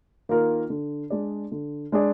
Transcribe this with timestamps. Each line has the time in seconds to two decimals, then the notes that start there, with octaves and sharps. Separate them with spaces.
0.29 D#3 A#3 F4 A#4
0.70 D3
1.10 G#3 D4 G#4 D5
1.52 D3
1.92 G#3 D4 G#4 D5